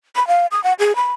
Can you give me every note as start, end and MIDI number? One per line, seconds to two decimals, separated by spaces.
0.16 0.26 83
0.28 0.47 77
0.52 0.62 87
0.64 0.73 78
0.79 0.96 68
0.96 1.14 83